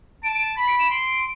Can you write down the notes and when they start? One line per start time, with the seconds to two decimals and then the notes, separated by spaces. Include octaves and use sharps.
0.23 A5 D7
0.35 D7
0.57 B5 B6
0.68 D7
0.79 E7
0.90 C6 D7